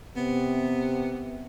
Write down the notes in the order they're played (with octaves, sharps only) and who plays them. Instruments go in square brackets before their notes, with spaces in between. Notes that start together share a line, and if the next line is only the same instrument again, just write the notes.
[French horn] C3 [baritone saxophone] B3